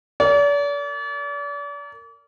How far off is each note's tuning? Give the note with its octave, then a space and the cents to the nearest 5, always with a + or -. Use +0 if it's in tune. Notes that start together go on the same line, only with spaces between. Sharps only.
A#4 -25 D5 -40